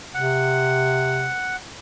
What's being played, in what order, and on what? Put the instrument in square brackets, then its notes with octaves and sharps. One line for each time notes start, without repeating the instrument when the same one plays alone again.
[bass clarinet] C3 [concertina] F#5